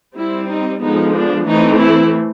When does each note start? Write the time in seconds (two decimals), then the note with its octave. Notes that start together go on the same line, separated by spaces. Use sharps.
0.17 G3 C4 E4
0.49 D#4
0.82 D3 F3 G#3 B3 D#4
1.14 D4
1.46 E3 A3 C4 D#4
1.79 E4